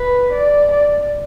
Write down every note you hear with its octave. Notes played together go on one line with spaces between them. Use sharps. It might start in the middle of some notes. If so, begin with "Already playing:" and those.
Already playing: B4
D5
D5